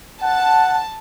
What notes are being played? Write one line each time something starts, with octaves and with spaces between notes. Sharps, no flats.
F#5 A5